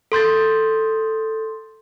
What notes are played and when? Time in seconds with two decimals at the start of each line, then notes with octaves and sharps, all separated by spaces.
0.12 A4 C6 G6 A6